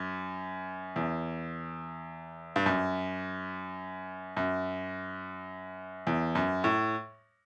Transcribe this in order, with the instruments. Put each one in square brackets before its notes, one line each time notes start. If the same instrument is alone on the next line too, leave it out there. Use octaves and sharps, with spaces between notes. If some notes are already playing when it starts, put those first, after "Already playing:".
Already playing: [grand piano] F#2
E2
G2
F#2
F#2
E2
F#2
A2